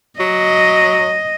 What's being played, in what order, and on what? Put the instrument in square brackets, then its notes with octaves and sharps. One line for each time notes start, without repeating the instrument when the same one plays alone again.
[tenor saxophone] F#3 [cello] D#5